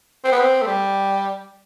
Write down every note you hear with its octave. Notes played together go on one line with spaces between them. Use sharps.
C4
B3
C4
A3
G3